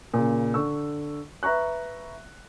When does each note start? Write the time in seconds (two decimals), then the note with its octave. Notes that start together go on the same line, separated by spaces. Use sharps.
0.14 A#2 C#3
0.54 D3 C#6 E6
1.43 B4 E5 A#5 C#6 F#6